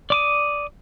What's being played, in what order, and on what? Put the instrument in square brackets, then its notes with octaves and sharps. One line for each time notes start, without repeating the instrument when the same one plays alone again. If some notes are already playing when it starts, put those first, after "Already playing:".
[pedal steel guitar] D5 D6 D#6